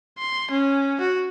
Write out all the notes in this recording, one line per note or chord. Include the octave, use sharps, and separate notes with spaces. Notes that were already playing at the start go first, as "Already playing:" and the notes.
C6
C#4
F#4